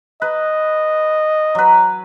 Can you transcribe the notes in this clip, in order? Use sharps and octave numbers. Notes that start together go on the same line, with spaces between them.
B4 D#5
F#3 B4